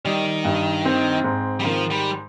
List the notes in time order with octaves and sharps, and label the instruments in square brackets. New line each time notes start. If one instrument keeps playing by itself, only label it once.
[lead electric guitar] D#3 [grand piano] G3
[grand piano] G2
C4
G#2
[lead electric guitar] G3
[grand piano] D#3 [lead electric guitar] F3
[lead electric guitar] G3